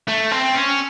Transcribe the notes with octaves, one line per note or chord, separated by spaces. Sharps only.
A3
C4
C#4